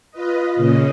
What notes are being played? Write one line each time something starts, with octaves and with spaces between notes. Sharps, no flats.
F4 B4 D#5
A#2 C#3 C#4 D#5